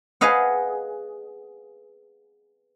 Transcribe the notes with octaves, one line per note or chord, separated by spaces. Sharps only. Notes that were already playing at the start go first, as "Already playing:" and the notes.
G#4 B4 D#5 F5 F#5